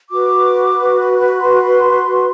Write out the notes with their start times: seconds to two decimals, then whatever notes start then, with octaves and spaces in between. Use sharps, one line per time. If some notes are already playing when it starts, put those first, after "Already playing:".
0.11 F#4 B4 D6
1.40 C6